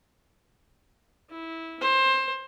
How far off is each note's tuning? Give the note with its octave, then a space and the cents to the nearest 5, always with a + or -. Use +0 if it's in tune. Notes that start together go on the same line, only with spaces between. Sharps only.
E4 -15
C5 +20